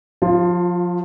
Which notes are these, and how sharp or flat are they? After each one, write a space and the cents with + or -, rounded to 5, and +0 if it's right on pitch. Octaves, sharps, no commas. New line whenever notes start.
F3 +30 F4 +0